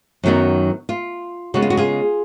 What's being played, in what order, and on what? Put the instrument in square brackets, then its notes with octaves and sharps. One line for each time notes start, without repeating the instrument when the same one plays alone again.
[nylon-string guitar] F#2 D#3 F#3 B3 D#4
F4
C#3 G#3 B3 F#4
F4
F#4
F4 G#4